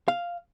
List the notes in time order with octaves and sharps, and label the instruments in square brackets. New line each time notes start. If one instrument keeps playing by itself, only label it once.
[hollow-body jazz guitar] F5